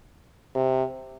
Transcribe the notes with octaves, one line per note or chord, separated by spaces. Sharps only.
C3